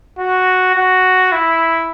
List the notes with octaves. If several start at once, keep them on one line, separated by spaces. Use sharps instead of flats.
F#4
F#4
E4